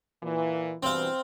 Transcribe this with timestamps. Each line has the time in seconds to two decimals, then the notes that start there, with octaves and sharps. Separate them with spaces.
0.23 A#2 E3
0.83 G2 B2 E3 C4 F5